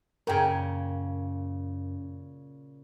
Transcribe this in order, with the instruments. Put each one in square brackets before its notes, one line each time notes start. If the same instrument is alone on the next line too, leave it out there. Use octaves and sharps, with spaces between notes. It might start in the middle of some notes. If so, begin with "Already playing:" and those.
[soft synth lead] F#2 [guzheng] A#2 C#3 [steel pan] A#4 G5 G#5